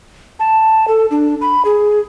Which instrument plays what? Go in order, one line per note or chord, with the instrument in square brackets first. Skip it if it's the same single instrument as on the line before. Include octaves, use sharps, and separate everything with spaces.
[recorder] A5
A4
D4
B5
G#4